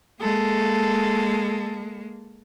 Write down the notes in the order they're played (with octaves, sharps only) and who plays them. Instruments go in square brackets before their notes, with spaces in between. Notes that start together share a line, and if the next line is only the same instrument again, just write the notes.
[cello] G#3 A#3 [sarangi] A4